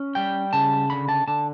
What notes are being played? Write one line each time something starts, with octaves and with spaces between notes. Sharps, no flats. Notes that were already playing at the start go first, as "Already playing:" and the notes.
Already playing: C#4
G3 G5
C#3 A5
D3 B5
A5
D3 A5